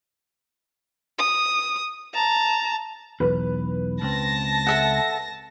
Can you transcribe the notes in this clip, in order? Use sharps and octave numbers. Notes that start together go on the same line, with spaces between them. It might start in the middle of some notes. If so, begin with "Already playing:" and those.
D#6
A5 A#5
B1 E2 B4
C#2 C4 A5 A#6
A4 E5 F#5